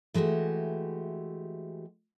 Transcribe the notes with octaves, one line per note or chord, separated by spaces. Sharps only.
E3 G#3 A3 F#4 G4